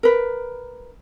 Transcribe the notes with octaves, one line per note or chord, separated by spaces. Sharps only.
A#4 B4